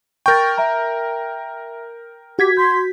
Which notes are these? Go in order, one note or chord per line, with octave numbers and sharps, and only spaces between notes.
A#4 G5 C#6 G6 A6
E5 A#5
F#4 G4 G#6 B6
C6 G6